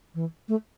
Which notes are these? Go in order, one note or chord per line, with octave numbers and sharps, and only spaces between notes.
E3
A3